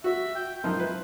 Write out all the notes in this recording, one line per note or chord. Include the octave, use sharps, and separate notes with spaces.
F#4 E5
G5
F#2 F3 D#4 C5
E4 B4